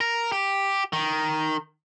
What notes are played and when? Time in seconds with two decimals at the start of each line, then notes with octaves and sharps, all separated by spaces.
0.01 A#4
0.32 G4
0.93 D#3